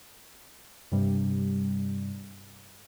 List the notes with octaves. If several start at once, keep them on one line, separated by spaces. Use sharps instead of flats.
G2 C3 G3